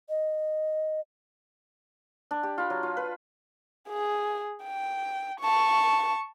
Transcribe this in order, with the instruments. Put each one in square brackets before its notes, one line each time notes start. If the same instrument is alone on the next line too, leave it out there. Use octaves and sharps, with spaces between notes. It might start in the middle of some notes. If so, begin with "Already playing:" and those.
[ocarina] D#5
[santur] D4
G4
F4 B5
F#3
F4
B4
[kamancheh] G#4
G5
A5 C#6